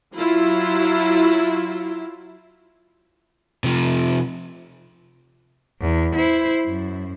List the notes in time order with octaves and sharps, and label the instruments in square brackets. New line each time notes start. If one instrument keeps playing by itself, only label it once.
[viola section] F#3 E4 F4
[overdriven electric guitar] C3 F3
[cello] E2
E4 C5
F#2